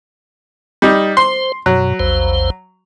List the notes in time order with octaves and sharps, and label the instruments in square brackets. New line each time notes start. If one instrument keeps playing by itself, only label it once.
[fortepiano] G3 D#4
[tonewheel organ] C5 [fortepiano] C6
[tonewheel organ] F#2 B2 [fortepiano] F#3
[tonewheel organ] A#1 E2 C5